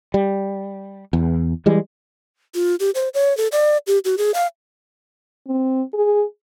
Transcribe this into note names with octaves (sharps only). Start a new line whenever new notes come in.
G3
E2
E3 G3 G#3
F4
G4
C5
C#5
A4
D5
G4
F#4
G#4
F5
C4
G#4